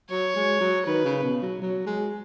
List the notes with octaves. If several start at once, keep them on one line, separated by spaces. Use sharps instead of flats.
F#3 C#5
G#3
F#3
D#3 B4
C#3
B2
F#3
F#3
G#3